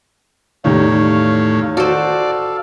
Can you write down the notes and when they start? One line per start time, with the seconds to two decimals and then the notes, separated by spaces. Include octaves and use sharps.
0.64 E2 A2 D#3 G3 C#5 F5
1.77 F#4 A4 C5 D5 F5